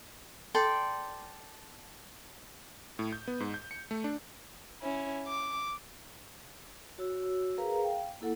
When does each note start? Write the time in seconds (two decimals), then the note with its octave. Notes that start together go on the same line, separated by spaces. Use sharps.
0.55 A4 D5 G5 C6
2.99 A2
3.13 G6
3.28 B3
3.40 G#2
3.54 G6
3.71 C#7
3.91 A3
4.04 D4
4.82 C#4 E4
5.27 D6
6.98 F#4 C#5 E6
7.58 G#4 A#4 B4 F5 A#5
7.83 F5 G5
8.21 A#3 E4 A4 F#5